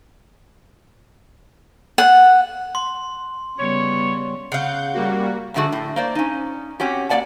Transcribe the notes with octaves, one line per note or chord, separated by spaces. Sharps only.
F#5
C6
C#3 G3 B3 C#5
C#3 F5 F#5 G6
G3 A#3 F#4
F2 G#2 D3 A3 F#4 G#4
A2 D3
A#3 C5 D5
C#4 D#4
C4 C#4 F#4 G4
A#3 C4 D5 F#5 A5